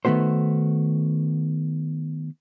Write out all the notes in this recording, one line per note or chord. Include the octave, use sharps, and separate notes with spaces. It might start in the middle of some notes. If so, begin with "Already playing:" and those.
D#3 A3 B3 F#4 C5